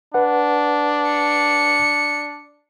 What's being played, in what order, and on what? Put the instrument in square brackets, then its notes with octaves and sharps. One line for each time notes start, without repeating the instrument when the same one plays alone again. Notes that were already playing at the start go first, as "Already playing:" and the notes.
[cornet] D4 [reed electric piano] B4 F#5
[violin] C#7